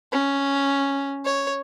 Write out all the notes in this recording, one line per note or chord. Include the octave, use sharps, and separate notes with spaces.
C#4
C#5